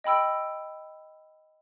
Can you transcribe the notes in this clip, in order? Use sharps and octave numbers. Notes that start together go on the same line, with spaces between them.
D#5 G5 B5 E6 D7